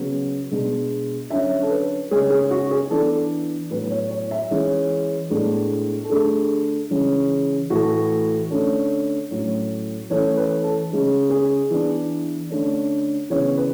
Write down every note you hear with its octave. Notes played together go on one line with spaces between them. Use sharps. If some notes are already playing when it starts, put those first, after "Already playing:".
Already playing: C#3 F#3 B3
B2 G#3 B3 D4
D3 F#3 C#4 E5
A4
B4
C#3 G#3 C#4 G#4
G#4
F#4
G#4
E3 B3 D4 A4
A2 F#3 B3 B4
C#5
C#5
E5
E3 G#3 C#4
A2 G#3 B3 D4
A4
D3 A3 D4 G#4
C#3 E3 G#3 C#4
A2 E3 A3 F#4
D3 A3 C#4
A2 F#3 A3 C#4
E3 A3 C#4 C#5
B4
A4
C#3 G#3 C#4
G#4
E3 B3 D4
D3 A3 C#4
C#3 E3 B3 C#5
B4